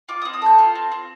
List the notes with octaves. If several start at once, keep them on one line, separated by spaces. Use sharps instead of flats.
F4 D6
D#6
C4
D#6
A4 G6
F4
C4
C4